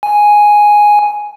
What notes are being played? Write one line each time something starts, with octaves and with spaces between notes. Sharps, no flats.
G#5